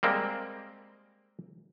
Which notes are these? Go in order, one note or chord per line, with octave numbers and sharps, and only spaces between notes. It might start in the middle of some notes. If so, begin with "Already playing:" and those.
G3 G#3 A#3 C4